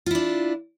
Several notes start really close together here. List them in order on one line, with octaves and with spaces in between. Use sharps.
F4 E4 D4